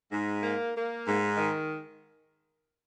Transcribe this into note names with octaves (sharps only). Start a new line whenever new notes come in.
G#2
A#3
A#3
G#2
D#3